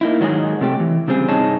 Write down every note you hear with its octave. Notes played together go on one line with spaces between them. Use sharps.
A#3 D#4 E4
G#2 D#3 F#3 G#3 D#4 G#4
C3 A3 G4
E3
C#3 G3 C4 G#4
G2 C3 D#4 G#4 C#5 A5